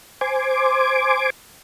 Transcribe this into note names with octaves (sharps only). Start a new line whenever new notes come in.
C5 G#5 D6